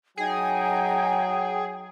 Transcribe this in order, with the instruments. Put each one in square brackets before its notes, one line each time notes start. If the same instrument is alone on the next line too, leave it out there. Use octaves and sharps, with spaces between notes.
[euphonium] F#3 [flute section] D#4 G#5 [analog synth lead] G#4 [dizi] G5